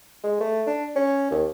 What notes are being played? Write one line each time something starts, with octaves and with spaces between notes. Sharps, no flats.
G#3
A3
D4
C#4
D#2